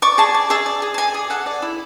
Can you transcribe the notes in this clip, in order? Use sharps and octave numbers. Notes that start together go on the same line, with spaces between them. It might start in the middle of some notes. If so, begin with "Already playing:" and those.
D5 C#6
G#4 A5
D5
G#4 E5
D5
G#4
A5
D5 G#5
G#4
A4 F#5
D5
E4